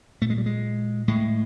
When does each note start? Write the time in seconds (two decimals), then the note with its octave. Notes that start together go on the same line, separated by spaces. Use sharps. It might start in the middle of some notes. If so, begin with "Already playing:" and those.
0.21 A#2 A3
0.30 G#3
0.38 G3
0.46 G#3
1.08 A2 G#3